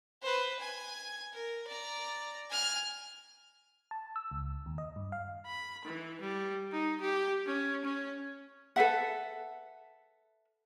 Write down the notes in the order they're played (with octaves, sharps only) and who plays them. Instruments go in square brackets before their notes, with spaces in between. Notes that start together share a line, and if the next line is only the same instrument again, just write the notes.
[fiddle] B4 C5
G#5
A#4
D5 A#5
G#5 F6
[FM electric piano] A5
E6
C#2
D#2
D#5
G2
F5
[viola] B5
E3
G3
D#4
G4
C#4
C#4
[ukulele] A4 B4 E5 F#5